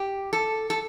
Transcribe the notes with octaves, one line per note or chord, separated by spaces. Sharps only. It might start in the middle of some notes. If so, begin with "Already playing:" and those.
Already playing: G4
A4
A4